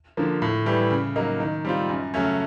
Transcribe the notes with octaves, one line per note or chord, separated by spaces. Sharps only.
D3 F3 A#3
A2
E3 G3
C#3
F#3 A#3 D#4
D#3
G3 C4 F4
F#2
C#3 F#3 A3 C#4